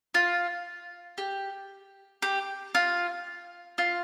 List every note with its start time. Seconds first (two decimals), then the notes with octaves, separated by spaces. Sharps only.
0.14 F4
1.18 G4
2.22 G4
2.75 F4
3.78 F4